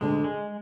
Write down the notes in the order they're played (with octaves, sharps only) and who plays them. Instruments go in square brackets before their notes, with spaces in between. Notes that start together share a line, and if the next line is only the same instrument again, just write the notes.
[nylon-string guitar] D2 D3 [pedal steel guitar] G#3
[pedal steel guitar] G#3